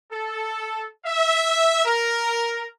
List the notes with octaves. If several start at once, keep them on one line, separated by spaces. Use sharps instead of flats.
A4
E5
A#4